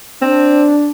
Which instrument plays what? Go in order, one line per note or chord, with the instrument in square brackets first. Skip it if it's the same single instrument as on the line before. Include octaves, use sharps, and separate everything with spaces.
[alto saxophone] C4 [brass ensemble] D4